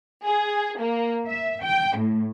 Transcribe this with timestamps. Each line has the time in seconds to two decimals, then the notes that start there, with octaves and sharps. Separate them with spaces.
0.25 G#4
0.79 A#3
1.26 E5
1.63 G5
1.96 A2